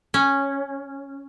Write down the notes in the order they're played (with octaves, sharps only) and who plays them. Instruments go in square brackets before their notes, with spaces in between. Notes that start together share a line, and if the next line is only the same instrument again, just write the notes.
[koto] C#4